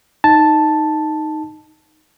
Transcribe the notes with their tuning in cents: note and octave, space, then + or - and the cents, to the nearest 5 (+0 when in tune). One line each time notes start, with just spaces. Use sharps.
D#4 +0 A5 +0